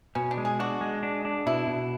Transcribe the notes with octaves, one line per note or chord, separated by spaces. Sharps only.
B2 C#4
D4
G#3
G#4
D4 F#4
G#3
D4
D4
B2 E4
B2